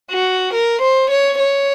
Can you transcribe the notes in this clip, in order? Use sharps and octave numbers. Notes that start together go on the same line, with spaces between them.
F#4
A#4
C5
C#5
C#5